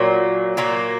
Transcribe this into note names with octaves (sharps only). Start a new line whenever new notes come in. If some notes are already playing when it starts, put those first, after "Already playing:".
Already playing: A#2 F#3 A#3
A#2 F#3 A#3